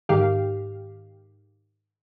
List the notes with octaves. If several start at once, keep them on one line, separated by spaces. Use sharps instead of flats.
G#2 D#3 G4 F5